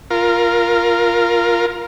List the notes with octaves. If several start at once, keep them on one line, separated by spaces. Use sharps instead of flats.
F4 A#4